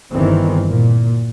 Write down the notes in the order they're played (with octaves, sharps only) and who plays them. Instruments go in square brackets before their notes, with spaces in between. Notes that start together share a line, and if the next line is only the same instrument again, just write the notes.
[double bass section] G1 E2 G2 D#3 E3 C4
A#2